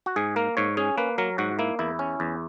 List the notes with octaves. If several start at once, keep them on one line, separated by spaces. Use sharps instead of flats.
F#4
G#2 G#4
A#3 A#4
G#2 C#5
C#4 G#4
A#3 B4
F#3 A#4
G#2 F#4
A#3 E4
E2 E4
C#4
E2